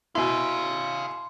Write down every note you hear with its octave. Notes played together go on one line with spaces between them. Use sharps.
B2 E4 F5 G#5 C6